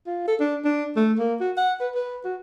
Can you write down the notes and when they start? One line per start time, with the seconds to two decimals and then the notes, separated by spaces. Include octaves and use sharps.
0.07 F4
0.28 A4
0.40 D4
0.65 D4
0.96 A3
1.18 A#3
1.41 F#4
1.57 F#5
1.80 B4
1.95 B4
2.25 F#4